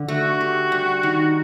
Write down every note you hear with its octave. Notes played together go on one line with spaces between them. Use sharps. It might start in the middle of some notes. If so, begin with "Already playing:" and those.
Already playing: D3
A3 F#4
G4
G3
D#3